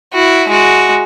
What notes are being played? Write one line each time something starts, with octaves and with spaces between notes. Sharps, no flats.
E4 F#4
G#3 F#4